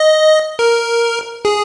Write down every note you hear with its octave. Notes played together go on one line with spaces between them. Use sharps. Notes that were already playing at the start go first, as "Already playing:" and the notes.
Already playing: D#5
A#4
G#4